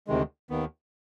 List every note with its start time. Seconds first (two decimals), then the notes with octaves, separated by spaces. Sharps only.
0.07 D2 C3 D#3 G#3
0.50 D#2 D#3 B3